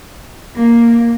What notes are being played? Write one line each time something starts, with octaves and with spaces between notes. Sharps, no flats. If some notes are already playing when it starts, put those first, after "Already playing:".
A#3